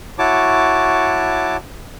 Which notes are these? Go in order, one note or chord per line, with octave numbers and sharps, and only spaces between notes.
E4 F#4 C#5 A5 D6